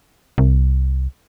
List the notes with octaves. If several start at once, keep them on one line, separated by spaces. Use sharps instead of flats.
C2